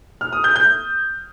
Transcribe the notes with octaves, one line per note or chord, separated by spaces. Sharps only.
F6
D#6
G6
G6